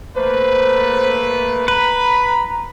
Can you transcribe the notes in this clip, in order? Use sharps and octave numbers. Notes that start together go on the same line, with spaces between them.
A3 A#3 B4 C5
B4 A#5 B5